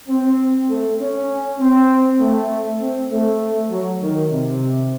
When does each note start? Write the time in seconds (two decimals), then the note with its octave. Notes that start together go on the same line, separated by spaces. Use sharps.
0.08 C4
0.69 A3
0.99 C#4
1.60 C4
2.20 A3
2.80 C4
3.10 A3
3.71 F#3
4.01 D#3
4.31 C3